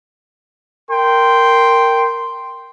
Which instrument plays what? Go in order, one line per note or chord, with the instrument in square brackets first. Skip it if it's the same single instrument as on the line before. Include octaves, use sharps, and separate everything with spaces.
[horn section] A#4 G5 C6